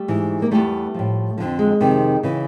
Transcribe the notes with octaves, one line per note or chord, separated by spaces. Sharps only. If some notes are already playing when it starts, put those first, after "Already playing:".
Already playing: G3 A3
G#2 E3
A#3
E2 C#3 E3 G3 A3
A2 F3
F2 D3 F3
G#3
F2 C3 D#3
C#3 E3